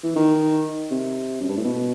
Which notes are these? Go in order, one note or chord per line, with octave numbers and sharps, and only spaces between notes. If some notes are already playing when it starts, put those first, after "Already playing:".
E3
D#3
C3
F#2
G2
A2
B2